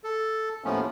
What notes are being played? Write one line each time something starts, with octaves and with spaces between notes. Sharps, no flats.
A4
D#2 A2 F3 A3 B3 C#4